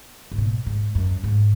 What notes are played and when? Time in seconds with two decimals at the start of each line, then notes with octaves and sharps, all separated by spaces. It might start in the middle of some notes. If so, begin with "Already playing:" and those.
0.32 G#2
0.38 B2
0.66 G#2
0.95 F#2
1.24 G#2